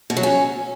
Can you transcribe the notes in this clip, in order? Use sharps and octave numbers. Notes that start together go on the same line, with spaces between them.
B2
F#3
C#4